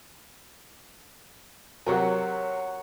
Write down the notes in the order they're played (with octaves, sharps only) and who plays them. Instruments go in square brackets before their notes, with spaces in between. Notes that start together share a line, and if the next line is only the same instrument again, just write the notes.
[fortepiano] C3 F#3 [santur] A#4 C#5 F#5